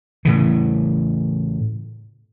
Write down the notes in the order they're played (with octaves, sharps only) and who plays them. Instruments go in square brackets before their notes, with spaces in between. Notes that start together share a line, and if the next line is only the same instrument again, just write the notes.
[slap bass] A2 C#3 E3